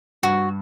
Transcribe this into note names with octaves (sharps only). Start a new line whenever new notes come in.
G2 F#4